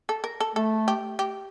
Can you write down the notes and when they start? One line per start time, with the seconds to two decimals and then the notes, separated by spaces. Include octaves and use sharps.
0.09 A4
0.24 A#4
0.40 A4
0.55 A3 A4
0.88 G4
1.19 G4